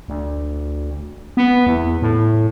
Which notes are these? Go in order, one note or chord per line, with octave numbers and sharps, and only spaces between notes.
D2
B3
E2
A2